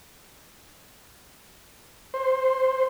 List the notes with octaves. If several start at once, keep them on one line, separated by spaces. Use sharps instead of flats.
C5